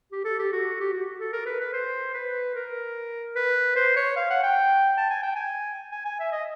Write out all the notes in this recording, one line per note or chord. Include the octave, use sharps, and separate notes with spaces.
G4
A4
G4
F#4
G4
F#4
A4
A#4
B4
B4
C5
B4
A#4
B4
C5
C#5
F5
F#5
G5
A5
G#5
G5
G#5
G#5
G#5
E5
D#5